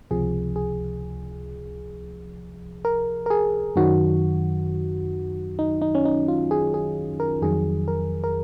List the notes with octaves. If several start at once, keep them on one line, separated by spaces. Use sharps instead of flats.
C#2 C3 F3 G#4
G#4
A#4
A#4
G#4
F#2 D#3 F#3 F#4
D#4
D#4
C#4
D#4
F4
G#4
G#4
A#4
F2 D#3 F#3 G#4
A#4
A#4